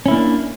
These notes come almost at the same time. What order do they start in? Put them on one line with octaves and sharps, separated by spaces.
C#4 E4 A#3 D4